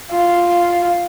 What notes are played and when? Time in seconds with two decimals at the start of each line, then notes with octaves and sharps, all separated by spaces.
0.11 F4